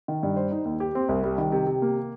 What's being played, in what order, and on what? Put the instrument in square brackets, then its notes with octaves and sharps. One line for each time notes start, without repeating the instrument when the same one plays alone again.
[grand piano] D#3
G2
C5
D#4
D#2
G4
C4
C2
G3
D#3
C3
C3
A#3